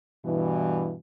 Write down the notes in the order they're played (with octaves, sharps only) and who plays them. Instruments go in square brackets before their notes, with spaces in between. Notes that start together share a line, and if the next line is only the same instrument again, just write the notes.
[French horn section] G2 B2 E3